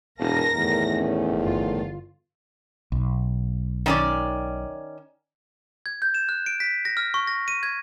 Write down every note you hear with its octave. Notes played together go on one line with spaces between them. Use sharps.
E1 A#4 F5 G#5 A5 A#6
E2 A2 D#3 A3
C#4
G1 F4
B1
D#3 C#4 D5
G#6
G6
E7
F#6
D7
B6
A#6
F6
C#6
A#6
D#7
G#6